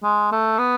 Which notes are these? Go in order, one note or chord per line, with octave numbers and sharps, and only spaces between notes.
G#3
A3
B3